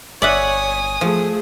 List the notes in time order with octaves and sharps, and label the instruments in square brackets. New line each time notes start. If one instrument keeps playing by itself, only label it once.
[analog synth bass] G1 [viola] C#5 [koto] D5 E5 F#5 [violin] G#5 D#6
[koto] F3 [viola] A3 G#4